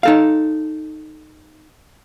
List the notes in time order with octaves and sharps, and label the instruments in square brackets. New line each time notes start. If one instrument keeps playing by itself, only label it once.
[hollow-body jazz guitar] D#4 A4 F5